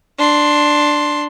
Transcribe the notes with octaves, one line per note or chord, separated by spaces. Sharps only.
D4 C6